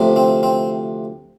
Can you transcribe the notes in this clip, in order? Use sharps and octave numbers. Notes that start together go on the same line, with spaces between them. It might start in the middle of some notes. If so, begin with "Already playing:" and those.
Already playing: D2 C3 F3
C4
C4